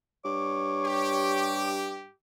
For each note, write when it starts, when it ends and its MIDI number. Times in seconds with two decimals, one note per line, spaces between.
0.25 2.06 43
0.25 1.72 73
0.25 2.02 86
0.85 2.11 67